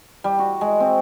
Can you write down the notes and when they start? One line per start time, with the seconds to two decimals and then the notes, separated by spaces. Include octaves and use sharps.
0.24 G3
0.39 F#4
0.61 G#3
0.80 C4